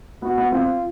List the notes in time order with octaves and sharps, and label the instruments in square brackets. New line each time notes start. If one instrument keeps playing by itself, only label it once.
[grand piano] B3 [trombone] F#4
[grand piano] B3
[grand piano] C4 [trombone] F4